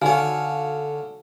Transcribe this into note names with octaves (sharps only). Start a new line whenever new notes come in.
D3 D#4 F#4 A4 C#5 F5 G#5